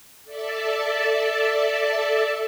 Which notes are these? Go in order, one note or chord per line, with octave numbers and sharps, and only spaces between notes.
A4 D5 E5 A5